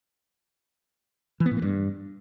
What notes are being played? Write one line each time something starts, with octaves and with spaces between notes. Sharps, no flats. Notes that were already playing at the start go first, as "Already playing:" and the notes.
E3
B3
A2
A#3
G2